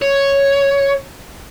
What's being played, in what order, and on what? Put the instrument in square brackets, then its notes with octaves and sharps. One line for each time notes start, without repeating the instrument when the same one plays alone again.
[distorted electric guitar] C#5